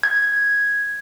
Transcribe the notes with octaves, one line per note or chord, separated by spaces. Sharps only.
G#6